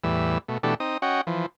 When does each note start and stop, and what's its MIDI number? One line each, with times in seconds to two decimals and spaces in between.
0.04 0.38 40
0.04 0.38 45
0.04 0.38 52
0.04 0.38 55
0.04 0.38 88
0.48 0.58 47
0.48 0.58 57
0.63 0.74 47
0.63 0.74 52
0.63 0.74 57
0.63 0.74 62
0.63 0.74 67
0.63 0.74 69
0.80 0.98 60
0.80 0.98 63
0.80 0.98 87
1.02 1.21 61
1.02 1.21 66
1.02 1.21 75
1.02 1.21 78
1.02 1.21 79
1.27 1.46 52
1.27 1.46 53